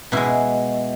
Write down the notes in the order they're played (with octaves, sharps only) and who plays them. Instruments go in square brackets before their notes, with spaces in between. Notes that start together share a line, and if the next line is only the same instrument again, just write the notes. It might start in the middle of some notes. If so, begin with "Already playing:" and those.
[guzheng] B2 G#3 E4